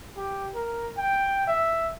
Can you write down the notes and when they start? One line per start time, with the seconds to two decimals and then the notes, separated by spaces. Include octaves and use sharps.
0.17 G4
0.54 A#4
0.98 G5
1.47 E5